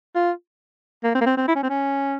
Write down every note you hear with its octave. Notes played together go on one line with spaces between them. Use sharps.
F4
A#3
C4
A#3
C4
C4
E4
C#4
C4
C#4